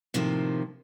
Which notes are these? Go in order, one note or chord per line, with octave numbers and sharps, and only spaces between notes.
A2 C3 D#3 F3 A#3